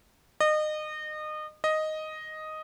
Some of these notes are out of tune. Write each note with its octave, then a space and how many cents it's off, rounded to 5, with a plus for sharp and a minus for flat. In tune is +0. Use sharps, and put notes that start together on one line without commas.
D#5 -30
D#5 +0